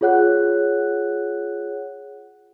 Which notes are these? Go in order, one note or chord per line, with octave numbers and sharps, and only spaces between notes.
F4 G#4 C#5 F#5 F#6